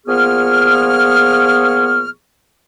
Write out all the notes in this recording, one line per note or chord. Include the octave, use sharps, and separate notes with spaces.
A#2 F3 B3 G#4 C#6 F6